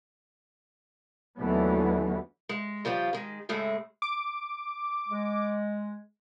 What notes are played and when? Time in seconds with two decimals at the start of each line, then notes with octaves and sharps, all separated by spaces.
1.39 D#2 D3 E3 F#3 A3 B3
2.49 G#3
2.85 C#3 F3 G3 F4
3.13 D#3 G#3
3.49 A2 C#3 G#3 A3
4.02 D6
5.09 G#3